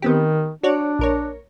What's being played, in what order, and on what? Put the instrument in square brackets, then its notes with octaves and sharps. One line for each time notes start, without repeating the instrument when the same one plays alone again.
[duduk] D#3 [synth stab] B3 C4 G4
[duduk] D4 [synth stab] F#4 C#5 D5
[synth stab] A#1 A#4 C#5